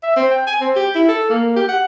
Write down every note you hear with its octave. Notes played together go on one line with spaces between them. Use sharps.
E5
C4
G5
G#5
C4
G4
E4
A4
A#3
G4
F#5